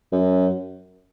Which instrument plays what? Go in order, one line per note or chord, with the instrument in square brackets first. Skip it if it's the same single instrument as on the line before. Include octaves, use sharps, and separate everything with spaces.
[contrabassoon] F#2